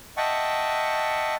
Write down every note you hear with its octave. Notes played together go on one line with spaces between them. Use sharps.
D#5 E5 F#5 G5 A5 C#6